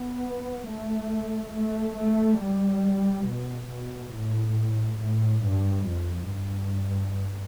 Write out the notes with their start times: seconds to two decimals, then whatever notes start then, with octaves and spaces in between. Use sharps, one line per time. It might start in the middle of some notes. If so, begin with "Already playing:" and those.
Already playing: B3
0.69 A3
1.56 A3
1.99 A3
2.43 G3
3.29 B2
3.73 B2
4.16 A2
5.03 A2
5.47 G2
5.90 F2
6.34 G2